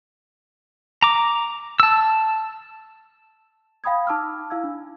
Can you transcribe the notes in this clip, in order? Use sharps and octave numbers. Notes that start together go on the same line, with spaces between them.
A#5 D6
A5 E6
F5 G5 B5 D#6 G#6
D#4 A5 D6 E6 F6
E4 F5 E6 G#6
D4